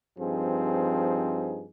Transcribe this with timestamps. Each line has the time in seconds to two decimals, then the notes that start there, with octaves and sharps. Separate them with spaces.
0.19 G2 F3 C4 D#4 G#4